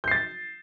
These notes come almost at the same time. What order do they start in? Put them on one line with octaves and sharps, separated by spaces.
G6 C7 A6